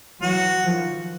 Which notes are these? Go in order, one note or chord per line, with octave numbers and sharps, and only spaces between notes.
E3 F#3 F#4
D#3 F3